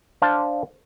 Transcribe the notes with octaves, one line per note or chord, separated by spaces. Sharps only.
D4 C5 F5 A5